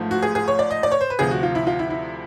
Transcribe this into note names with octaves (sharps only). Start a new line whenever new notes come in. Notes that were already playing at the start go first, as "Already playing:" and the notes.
Already playing: A1 G#2 F3 A3
F#4
G#4
G#4
C#5
D5
D#5
D5
C#5
C5
B4
D2 C3 F3 G#4
F#4
F4
E4
F4
E4
E4